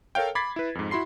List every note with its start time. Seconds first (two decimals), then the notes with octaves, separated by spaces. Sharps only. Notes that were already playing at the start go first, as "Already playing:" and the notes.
0.15 A4 A#4 C#5 F5 G5
0.35 B5 D6 G#6 A6 B6 C7
0.56 E4 B4
0.75 F2 G#2
0.91 E4 F#4 B5 C6 C7